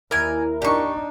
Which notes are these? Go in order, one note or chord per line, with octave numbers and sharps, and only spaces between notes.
D#2 E4 A#4 D5 G#5
D4 D#4 G4 C#6